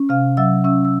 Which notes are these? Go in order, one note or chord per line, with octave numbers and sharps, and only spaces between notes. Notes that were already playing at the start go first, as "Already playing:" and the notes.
Already playing: C#4
C3 F5 F6
F#3 E5 E6
C#4 E5 E6
E6